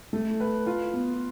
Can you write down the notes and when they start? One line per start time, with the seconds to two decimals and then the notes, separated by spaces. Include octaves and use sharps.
0.13 A3
0.40 B4
0.66 F4
0.94 B3